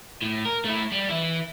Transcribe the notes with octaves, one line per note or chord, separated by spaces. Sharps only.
A2
A#4
A3 E4
G3
E3 E4